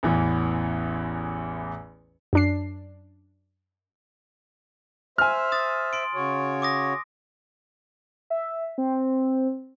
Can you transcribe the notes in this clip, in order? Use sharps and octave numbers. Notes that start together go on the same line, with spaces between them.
A1 E2 E3
F#2 D4 C7
C5 E5 G#5 F6
D#6 A6
C6 D7
C#3 F#4 C#5
D6 D#6 A#6
E5
C4